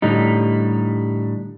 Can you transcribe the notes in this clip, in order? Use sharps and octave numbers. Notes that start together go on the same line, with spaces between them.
A2 D3 G3 D#4